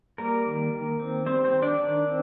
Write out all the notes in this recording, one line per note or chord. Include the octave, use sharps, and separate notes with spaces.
G3 A#3 A#4
D#3
D#3
C4
G3 C4 C5
C4 C5
D#3
D4 D5
D#3
C4